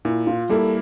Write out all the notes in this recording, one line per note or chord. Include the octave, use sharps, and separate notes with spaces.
A#2 E4
F4
G3 A#3 E4 A4